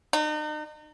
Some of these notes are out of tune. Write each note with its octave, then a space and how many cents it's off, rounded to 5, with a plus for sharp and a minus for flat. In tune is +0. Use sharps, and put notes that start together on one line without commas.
D#4 -40